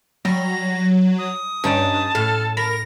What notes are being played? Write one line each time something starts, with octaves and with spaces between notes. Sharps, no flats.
F#3 G3 A#6
D#6
G2 C#4 D#4 G5 A5
A2 A4 F6
A#4 B5 A#6